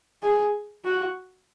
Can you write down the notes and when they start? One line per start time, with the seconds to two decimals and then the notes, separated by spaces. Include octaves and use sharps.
0.23 G#4
0.85 F#4